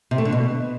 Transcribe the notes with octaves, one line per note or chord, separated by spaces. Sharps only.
C3
A3
D3
B2